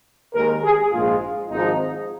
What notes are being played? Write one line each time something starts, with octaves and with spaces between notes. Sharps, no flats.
D#2 D#3 G#3 A#4
G#4
A#1 G#2 G#3 F4
G#1 G#2 F3 G#3 D#4